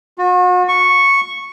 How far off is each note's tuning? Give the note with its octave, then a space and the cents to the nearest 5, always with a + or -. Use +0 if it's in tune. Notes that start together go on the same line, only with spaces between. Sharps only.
F#4 -40
C#6 -5